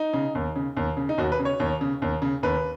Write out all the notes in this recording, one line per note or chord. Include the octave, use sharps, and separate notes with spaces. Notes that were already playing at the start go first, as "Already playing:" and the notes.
Already playing: D#4
C#3
D#2
C#3
D#2
C#3
D#4
D#2 F#4
B4
C#3
C#5
D#2
C#3
D#2
C#3
D#2 B4